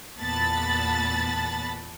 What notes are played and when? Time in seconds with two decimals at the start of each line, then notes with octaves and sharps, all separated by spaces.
0.19 E2 A#2 B3 A5 B5 A6